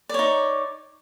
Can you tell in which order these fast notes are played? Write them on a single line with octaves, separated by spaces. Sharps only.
D5 C#5 D#4